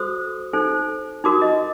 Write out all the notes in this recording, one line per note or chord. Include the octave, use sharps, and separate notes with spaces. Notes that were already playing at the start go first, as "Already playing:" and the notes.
Already playing: F#4 A4 C5 D#6
D#4 A4 C5
D#4 F#4 A#4 D6
D#5